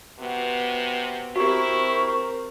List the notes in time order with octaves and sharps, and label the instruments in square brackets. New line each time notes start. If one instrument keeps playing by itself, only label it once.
[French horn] C3 [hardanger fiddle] B3 F#4
[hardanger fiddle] C4 A#4 [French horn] E4 [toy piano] F#4 G4 [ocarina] C#6